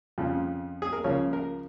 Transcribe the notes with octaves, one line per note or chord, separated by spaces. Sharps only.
F2 C#3 F3
G#4
A#4
C#2 C#3 F3 A#3 C#5
A#4